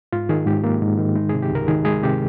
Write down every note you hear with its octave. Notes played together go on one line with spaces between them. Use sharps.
G#2 F4
D#3 G#4
G#2 G4
A#3
G#2
D#3
G#3 D#4
C3 G#4
G4
C#2 A#4
D#3 G#4
G#3 G#4
C3 G4